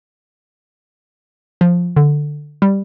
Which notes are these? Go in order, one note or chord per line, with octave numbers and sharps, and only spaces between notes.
F3
D3
G3